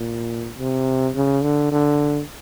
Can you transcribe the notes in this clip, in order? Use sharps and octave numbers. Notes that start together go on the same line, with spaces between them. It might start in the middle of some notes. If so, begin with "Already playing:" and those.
Already playing: A#2
C3
C#3
D3
D3